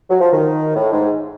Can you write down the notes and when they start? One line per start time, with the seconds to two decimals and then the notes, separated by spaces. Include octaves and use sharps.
0.10 F#3
0.21 F3
0.32 D#3
0.75 A2
0.92 G#2